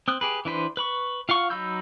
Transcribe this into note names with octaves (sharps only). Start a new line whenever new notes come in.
C4 D#6 F#6
G4 G#4 B4
E3 D4 B4 C5
B4 B5 C#6
F4 F5 F#5 C#6
F#3 D#4 B5 E6 G6